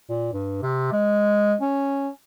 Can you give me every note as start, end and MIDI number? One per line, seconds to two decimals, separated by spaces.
0.10 0.32 46
0.33 0.60 43
0.62 0.89 48
0.92 1.55 56
1.61 2.09 61